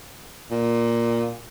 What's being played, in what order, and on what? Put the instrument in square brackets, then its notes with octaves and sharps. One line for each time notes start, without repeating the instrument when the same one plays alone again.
[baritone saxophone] A#2